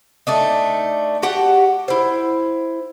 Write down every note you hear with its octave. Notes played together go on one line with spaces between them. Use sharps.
A3 D4 D#4
F#4 G4 F#5 A5
E4 C5